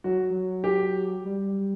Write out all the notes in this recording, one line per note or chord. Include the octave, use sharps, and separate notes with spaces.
F#3 F#4
F#3
G4
G3